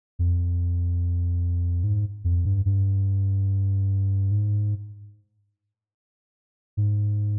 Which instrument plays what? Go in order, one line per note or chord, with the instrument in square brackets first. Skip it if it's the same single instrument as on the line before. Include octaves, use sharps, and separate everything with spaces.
[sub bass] F2
G#2
F2
G2
G2
G#2
G#2